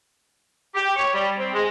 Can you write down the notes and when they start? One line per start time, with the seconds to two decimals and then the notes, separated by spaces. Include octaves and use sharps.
0.75 G4
0.96 C#5
1.13 G3
1.39 C4
1.53 G#3